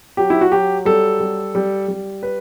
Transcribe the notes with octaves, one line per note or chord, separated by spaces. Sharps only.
F#3 G4
E4
F#4
F#3 G4
G3 A4
G3
G3
G3
B4